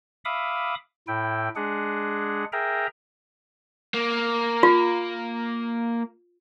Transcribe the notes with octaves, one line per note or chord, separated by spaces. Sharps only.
E5 F5 B5 D6 D#6
A2 E4 G5
G#3 D4 G#4 F#5
G#4 A#4 E5 G5 A#5
A#3
F4